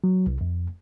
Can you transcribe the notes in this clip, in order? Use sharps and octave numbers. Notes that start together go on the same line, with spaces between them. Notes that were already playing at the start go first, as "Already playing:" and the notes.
F#3
C2
F2